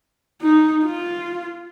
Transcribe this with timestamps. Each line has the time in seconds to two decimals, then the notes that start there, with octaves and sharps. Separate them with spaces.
0.42 D#4
0.85 F4